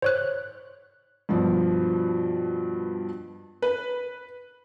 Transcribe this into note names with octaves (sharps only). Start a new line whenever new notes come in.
C5 C#5 F#6
G2 B2 F3
B4